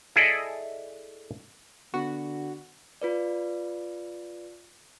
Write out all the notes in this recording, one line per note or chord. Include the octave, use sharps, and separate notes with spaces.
E4 G#4 A4 D5 D#5
D3 B3 F#4
F4 B4 D5